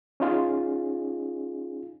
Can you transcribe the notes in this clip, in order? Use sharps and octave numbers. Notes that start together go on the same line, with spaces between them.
C#4 D#4 F4 G#4